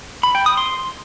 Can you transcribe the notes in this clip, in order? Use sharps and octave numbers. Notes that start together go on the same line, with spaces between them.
B5
G5
D#6
C6